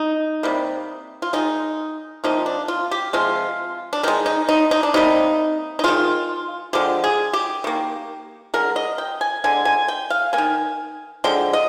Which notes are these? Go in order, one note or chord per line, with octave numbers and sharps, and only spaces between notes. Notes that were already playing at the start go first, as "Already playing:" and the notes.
Already playing: D#4
C3 G3 A#3
F4
D#3 G#3 D#4
C3 F3 A#3 D#4
D4
F4
G4
C3 F3 G#3 F4
D4
D#3 G#3 D#4
D#4
D#4
D#4
D4
C3 G3 A#3 D#4
D#4
D#3 G#3 F4
D3 F3 G#3 G4
G#4
G4
D#3 A#3
D3 G#3 A#4
D#5
G5
G#5
D3 G#3 G#5
G#5
G5
F5
A#3 G#5
D#3
D3 F3 G#3 G5
D#5